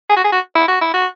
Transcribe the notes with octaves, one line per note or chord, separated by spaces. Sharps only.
G#4
F#4
G#4
F#4
E4
F#4
E4
F#4